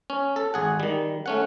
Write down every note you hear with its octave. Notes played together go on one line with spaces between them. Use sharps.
C#4
A4
G#1 G#4 F#5
D#3 G3
A3 C#4 F#5